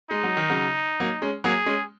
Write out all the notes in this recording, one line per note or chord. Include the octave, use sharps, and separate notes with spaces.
G#3 D#4
F#3
D#3
C#3 F#3
F#3 A#3
G#3 C#4
F#3 A#3 G#4
G#3 C#4